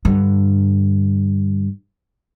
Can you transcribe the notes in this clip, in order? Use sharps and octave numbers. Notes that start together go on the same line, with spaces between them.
G2 D3